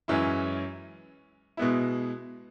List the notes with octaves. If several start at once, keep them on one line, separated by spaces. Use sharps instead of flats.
F#2 E3 G#3 C#4 E4
B2 G#3 B3 E4